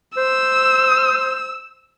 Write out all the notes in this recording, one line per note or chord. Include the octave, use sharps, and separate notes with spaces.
C5 E6